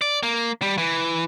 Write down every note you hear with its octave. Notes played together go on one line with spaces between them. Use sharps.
D5
A#3
G3
E3